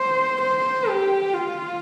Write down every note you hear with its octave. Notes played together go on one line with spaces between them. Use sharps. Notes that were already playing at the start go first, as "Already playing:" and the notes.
Already playing: C5
C5
G4
F4